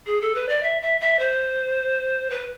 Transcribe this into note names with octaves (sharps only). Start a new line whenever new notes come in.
G#4
A4
B4
D5
E5
E5
E5
C5
B4